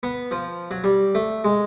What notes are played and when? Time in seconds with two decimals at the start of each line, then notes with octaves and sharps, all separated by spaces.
0.03 B3
0.31 F3
0.71 F#3
0.84 G3
1.15 A3
1.44 G#3